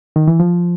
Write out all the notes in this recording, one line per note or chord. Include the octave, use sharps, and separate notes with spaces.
D#3
E3
F3